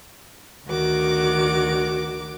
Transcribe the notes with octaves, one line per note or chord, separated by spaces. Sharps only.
D2 D#3 F#4 A#4 D6